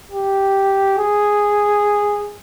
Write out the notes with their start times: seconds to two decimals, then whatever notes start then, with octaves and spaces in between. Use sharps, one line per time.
0.12 G4
0.98 G#4